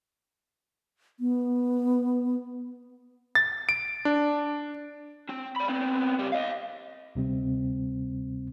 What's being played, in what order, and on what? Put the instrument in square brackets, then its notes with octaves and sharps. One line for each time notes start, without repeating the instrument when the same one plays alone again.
[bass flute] B3
[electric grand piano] A6
D7
D4
[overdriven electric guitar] C4
D5 B5
B3 C4
C#2 G3
D#5 F5
[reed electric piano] D2 C3 G3 C4